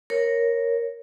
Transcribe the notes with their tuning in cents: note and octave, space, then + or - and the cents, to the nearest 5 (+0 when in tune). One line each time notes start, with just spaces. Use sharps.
A#4 +0 C#5 -5